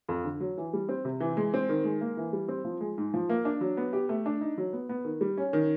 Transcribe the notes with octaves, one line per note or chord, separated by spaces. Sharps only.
F2
D3
F#3
E3
G3
C4
C3
E3
G#3
C4
D#3
G#3
A#3
E3
G3
C4
F3
G#3
G#2
F3
A#3
D4
F#3
B3
G4
A3
D4
D#4
F#3
B3
B3
D#3
G3
C#4
D#3